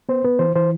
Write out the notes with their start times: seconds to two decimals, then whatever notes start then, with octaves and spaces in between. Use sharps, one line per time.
0.09 B3 C5
0.25 B3 B4
0.39 E3 C5
0.56 E3 C5